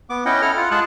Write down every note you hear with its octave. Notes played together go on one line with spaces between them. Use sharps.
B3 D6
C#4 E4 D#5 F#5 G5
E4 A4 F6
F4 F#5
G#3 F4 G#4 A5 F#6